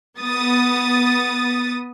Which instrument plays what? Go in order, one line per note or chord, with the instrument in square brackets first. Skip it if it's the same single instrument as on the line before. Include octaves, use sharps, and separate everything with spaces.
[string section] B3 D#6 A6